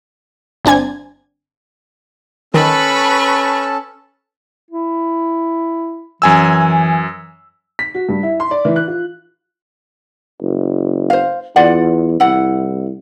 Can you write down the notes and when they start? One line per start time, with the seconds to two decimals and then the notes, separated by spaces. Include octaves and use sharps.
0.65 G1 C4 D4 G#5 G#6
2.54 D#3 C#4 A4 B4 A5 B5 C#6
4.70 E4
6.22 F#2 E3 G#5 E6
7.79 B6
7.94 F#4
8.09 G2
8.23 E4
8.40 C6
8.51 D5
8.65 E3
8.76 F#6
8.88 F4
10.42 F#1
11.10 C5 F5
11.56 E2 F4 D5 F#5
12.20 C2 E4 F#5